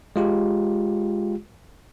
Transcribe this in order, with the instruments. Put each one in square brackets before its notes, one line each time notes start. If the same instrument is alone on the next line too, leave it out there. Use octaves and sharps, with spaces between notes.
[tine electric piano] G#3 F4 G4